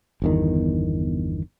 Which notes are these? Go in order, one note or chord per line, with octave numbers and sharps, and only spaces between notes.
G1 E2 D#3